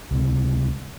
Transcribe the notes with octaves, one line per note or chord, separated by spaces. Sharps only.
C#2 C3